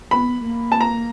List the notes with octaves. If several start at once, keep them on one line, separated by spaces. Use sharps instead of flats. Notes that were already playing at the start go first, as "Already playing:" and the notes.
B3 B5
A#3
A5
A#5